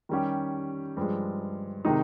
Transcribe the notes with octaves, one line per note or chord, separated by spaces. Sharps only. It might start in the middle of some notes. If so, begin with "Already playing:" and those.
D#3 G3 C#4 G4
G2 F3 G#3
C3 D#3 G#3 D#4